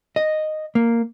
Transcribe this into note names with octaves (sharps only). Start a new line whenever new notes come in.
D#5
A#3